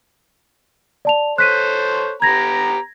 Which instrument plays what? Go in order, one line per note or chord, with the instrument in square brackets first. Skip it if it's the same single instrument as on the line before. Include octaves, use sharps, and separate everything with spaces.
[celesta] D5 A5 F7
[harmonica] A4 C5 C#5 [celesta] F#6 B6 D#7
[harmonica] B3 G4 A#5 [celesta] G#6 A#6